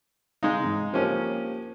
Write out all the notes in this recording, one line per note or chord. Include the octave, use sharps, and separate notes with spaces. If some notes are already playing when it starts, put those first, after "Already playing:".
G#3 D#4 F5
G#2
F3 A#3 C#4 G4